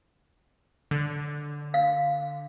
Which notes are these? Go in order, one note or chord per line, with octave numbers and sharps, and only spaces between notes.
D3
F5